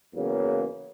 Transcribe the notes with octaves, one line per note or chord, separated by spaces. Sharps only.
E2 C#3 F#3 A#3